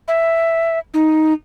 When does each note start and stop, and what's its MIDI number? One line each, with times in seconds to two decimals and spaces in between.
0.08 0.79 76
0.94 1.33 63